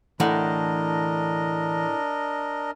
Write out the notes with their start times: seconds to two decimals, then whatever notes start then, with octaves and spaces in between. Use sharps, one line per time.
0.20 A2 D3 E3 D4 A#4 D#5 F#5